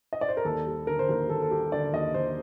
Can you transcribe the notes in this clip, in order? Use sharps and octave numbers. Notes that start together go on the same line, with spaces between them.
D#5
D5
C5
A#4
D#2 A4
G3
D3 A#4
C5
D#2 A#4
D#2 A4
A4
G3 G4
D3 D5
D#2 D#5
D#2 C5